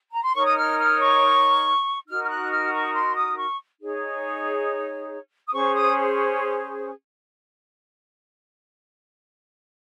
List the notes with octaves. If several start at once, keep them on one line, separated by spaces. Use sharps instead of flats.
A#5
C6
D#4 A#4 C#5 C#6
D#6
F6
F6
C#6
D#4 F#4 A#4 F6
F6
F#6
F6
C#6
C6
D#6
C#6
D#4 G#4 C#5
D#6
C#4 G#4 C5 C#6
D#6